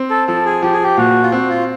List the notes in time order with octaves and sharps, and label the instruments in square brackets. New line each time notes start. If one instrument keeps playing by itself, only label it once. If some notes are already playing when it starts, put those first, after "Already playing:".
Already playing: [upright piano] C4
[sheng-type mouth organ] A4
[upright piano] F3 [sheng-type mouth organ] A4
[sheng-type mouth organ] G#4
[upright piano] F3 [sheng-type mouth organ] G4
[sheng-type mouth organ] G#4
G4
[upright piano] A#2 [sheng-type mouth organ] F#4
[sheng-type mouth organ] F4
[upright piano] C4 [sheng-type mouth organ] F#4
[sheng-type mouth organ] F4